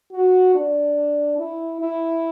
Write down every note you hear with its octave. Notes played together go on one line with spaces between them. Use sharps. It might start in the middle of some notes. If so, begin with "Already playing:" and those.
F#4
D4
E4
E4